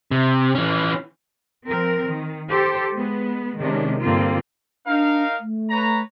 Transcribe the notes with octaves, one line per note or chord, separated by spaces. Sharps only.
C3
E3 C#4
F3 C4 A#4
D#3
G4 A4 C5
G#3 B3
C3 D#3 G#3 C#4 D4
G2 D3 A#3 C4 F4
D4 D#4 A#4 F5
A3
B4 C#5 A#5